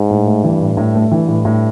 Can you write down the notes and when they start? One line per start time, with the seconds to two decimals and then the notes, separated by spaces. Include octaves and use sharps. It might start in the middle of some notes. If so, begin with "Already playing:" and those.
Already playing: G#2
0.10 A2
0.27 A3
0.44 G2 E3
0.60 A2
0.77 A2
0.95 A3
1.11 G2 E3
1.28 A2
1.45 A2